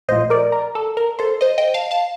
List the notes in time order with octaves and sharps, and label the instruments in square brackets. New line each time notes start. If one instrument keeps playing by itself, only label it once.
[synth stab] A#1 A2 F3 C5 D#5
A#4 D5
A#4
A4
A#4
A4 C5
C5 D#5
D#5 G5
F5 A5
F5 A5